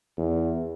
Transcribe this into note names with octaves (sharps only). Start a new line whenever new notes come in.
E2